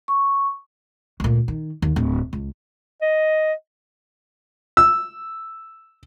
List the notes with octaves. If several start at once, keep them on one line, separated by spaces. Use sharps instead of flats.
C#6
D2 A#2
D#3
D#2
D1
C#2
D#5
E6